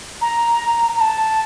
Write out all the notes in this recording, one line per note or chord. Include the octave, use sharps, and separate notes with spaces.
A#5
A#5
A5